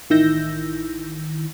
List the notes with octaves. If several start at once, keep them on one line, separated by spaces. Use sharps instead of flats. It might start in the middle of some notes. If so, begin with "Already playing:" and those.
A1 D#3 E4 E6 G6 A#6